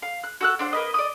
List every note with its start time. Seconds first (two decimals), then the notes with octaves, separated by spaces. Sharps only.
0.02 F5
0.24 F#6
0.41 F#4 A4 F#6
0.59 D4 C5 F#5
0.73 A#3 B4 D#5
0.94 D5 D#5 D#6